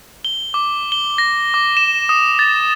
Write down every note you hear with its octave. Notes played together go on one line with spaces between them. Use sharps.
G7
D6
G7
A#6
D6
E7
D#6
A6